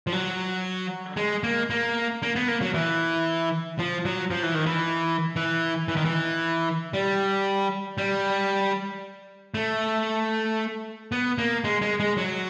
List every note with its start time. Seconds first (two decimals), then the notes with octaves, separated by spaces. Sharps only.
0.07 F3
0.12 F#3
1.17 G#3
1.43 A#3
1.70 A#3
2.22 A#3
2.36 B3
2.48 A#3
2.61 F#3
2.74 E3
3.79 F3
4.05 F#3
4.31 F3
4.43 E3
4.55 D#3
4.66 E3
5.36 E3
5.88 E3
5.96 D#3
6.05 E3
6.93 G3
7.98 G3
9.54 A3
11.12 B3
11.38 A#3
11.64 G#3
11.81 G#3
12.00 G#3
12.17 F#3